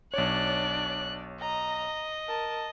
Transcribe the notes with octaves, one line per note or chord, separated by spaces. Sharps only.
B1 D4 C#5 D5 F#6
D#5 A#5
A#4 A5